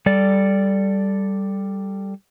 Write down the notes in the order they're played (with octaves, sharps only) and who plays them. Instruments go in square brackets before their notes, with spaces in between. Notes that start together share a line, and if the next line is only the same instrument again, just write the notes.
[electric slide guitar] G3 A4 D5